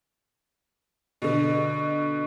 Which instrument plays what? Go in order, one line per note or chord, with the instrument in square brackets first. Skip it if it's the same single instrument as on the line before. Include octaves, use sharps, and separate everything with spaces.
[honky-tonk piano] B2 D3